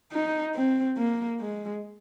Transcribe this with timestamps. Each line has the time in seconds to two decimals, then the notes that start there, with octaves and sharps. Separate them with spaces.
0.12 D#4
0.55 C4
0.97 A#3
1.40 G#3